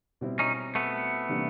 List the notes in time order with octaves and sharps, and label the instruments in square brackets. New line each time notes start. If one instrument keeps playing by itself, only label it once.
[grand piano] B2 G3 C4 E4
[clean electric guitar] C#4 D#4
A3 B3
[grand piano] C3 E3 G3 A#3 D4